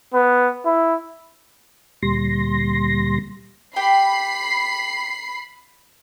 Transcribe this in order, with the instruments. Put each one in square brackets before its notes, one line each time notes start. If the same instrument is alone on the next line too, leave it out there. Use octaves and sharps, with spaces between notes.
[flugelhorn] B3
E4
[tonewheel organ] D2 A#2 G3 C6 A#6
[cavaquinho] G4 G5 [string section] B5 C7